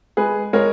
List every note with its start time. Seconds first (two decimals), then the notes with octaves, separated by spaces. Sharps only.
0.17 G#3 G#4 B4
0.53 G#3 A#4 C#5